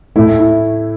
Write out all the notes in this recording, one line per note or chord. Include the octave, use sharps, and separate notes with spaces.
A2 A3 E4
E4